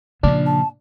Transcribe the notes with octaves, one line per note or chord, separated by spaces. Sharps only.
A#2 C#3 F3 D4
A5